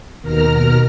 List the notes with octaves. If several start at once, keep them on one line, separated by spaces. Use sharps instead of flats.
D#2 B2 A#4 A#5 F6